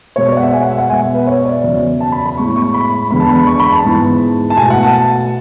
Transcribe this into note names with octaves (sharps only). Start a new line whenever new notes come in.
B2 G#3 B3 C#5
D5
F#5
E5
G#5
F#5
E5
F#5
B2 G#3 B3 G#5
E5
B4
C#5
E5
D5
E2 C#3 F#3 B3
A5
B5
B5
A2 G#3 B3 C#6
C#6
B5
E2 D3 G#3 B3 B5
A5
B5
C#6
B5
A5
G#2 E3 G#3 B3
A5
B2 A3 G#5
F#5
A5